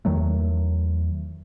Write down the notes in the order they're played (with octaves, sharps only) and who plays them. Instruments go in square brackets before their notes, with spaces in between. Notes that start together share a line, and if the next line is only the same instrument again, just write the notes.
[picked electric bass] E2 D#3 F#3 A3